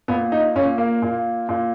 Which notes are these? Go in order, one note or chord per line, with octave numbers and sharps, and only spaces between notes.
A#2 B3
D#4
A#2 C#4
A#3
A#2
A#2